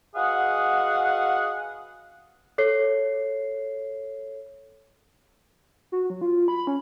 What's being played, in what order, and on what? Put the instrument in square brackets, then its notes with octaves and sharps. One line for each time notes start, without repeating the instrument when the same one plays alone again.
[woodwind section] F#4 G#4 B4 D#5 F5 F#5
[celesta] A4 C#5 C7
[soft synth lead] F#4
F#3
F4
B5
C#4